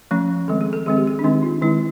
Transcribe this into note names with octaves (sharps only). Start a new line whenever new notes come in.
F3 A3 C#4
D#3 G#3 C4 A4
G#4
A4
D#3 G#3 C4 G#4
G4
G#4
D4
D#3 G#3 C4 D#4
F4
D#3 G#3 C4 E4